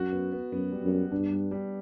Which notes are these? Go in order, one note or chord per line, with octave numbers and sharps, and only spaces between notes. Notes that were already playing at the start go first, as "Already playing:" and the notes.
Already playing: F#2 F#4
B3
B3
F#2 B3
G3
F#2
B3
G2 D4
G3
G3